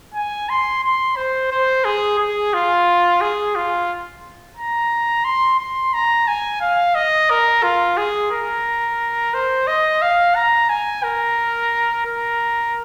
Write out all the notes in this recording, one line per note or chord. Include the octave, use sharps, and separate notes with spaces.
G#5
C6
C6
C5
C5
G#4
G#4
F4
G#4
F4
A#5
C6
C6
A#5
G#5
F5
D#5
A#4
F4
G#4
A#4
C5
D#5
F5
A#5
G#5
A#4
A#4